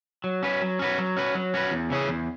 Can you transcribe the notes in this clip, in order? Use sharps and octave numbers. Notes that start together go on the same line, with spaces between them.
F#3
C#4 F#4 B4
F#3
C#4 F#4 B4
F#3
C#4 F#4 B4
F#3
C#4 F#4 B4
E2
C#3 E3 C#4 G#4
E2